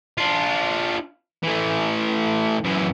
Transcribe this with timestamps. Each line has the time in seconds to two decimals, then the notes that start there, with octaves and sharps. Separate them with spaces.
0.18 D4 F4
1.43 E3 A3
2.64 F#2 E3